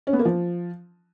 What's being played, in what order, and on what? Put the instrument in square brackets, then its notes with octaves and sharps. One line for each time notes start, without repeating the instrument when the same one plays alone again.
[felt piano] C#4
B3
A#3
F3